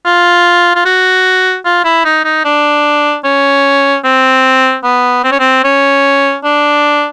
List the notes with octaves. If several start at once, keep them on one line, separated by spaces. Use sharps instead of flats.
F4
F4
F#4
F4
E4
D#4
D#4
D4
C#4
C4
B3
C4
C#4
C4
C#4
D4